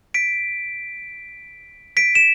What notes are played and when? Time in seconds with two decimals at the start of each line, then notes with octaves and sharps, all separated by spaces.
0.14 B6 D7
1.97 B6 D7
2.15 E7